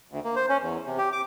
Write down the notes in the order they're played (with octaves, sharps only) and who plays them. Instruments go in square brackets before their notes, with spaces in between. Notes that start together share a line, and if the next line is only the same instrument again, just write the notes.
[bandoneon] D2
A#3
C5
C#4
E2
C3
G4
D6